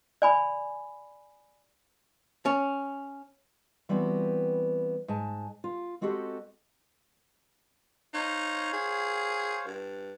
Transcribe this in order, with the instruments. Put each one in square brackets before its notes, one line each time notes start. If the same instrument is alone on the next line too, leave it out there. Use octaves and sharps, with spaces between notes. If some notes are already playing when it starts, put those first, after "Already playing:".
[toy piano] D5 G#5 B5
[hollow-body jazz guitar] C#4
[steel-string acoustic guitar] E3 G3 B3 C4 E4 F#4
G#2 G#5 A5
F4
G#3 C4 F#4 G4 A4 D#5
[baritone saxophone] D#4 [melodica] C5 C#5 F5
[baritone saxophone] G#4
G2